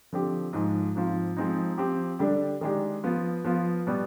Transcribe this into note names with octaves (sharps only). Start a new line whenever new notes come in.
D3 F3 C4 G4
G#2 F3 G#3
G#2 F3 C4 F4
F3 G#3 C4 D#4
F3 C4 G4
D3 G3 D4 G4
D#3 G#3 D4 G4
F3 B3 F4
F3 B3 F4
B2 G3 B3